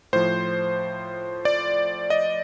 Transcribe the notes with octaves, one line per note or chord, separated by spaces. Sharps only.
A2 F3 C5
D5
D#5